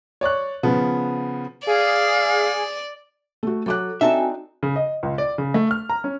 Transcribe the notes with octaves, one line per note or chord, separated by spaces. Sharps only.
C#5 D5 C#6 F#6
C#3 F3 B3
G#4 D5 F5
A3 F#4
F#3 A4 D6 F#6
C4 D4 D#4 F#4 A4 E5 G5 G#5
C#3
D#5
C#2
D5
C#3
A3
F6
A#5
C#4